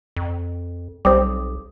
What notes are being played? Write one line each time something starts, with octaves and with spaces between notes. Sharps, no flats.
F2
B1 G3 C4 D6 D#6